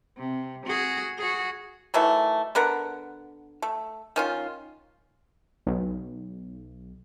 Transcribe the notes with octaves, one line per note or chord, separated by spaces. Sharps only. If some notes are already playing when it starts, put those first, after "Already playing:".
C3
F#4 G#4
F#4 G#4
D#3 E3 F#3 A3
D3 B3 A#4 F#5
A3
D#3 C#4 F4
B1